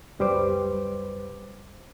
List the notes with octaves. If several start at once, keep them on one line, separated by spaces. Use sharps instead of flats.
C#2 F#2 G3 B4 C5 D6